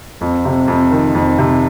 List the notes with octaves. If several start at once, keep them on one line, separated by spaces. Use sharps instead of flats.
F2
C3
F2
D#3
F2
C3